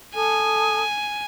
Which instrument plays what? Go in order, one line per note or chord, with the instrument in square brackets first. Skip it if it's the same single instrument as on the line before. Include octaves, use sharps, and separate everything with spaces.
[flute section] A4 D#6 [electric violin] G#5